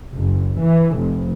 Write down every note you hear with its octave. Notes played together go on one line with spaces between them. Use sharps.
F#1
E3
F1